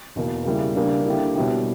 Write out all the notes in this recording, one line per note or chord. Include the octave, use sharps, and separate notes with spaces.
E2 B2 A#3
C#3 G3 A#3 E4
C#3 G3 A#3 D4
D3 A#3 E4 G4
B2 G3 C#4 E4 G4